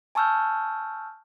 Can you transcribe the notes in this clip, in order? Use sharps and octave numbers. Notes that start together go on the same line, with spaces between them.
G#5 A5 C#6 E6 F6 G6